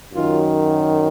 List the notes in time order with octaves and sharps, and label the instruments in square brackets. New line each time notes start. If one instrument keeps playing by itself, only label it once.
[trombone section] F#2 D#3 F#3 F4